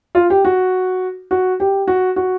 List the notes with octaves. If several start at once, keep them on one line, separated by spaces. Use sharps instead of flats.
F4
G4
F#4
F#4
G4
F#4
F#4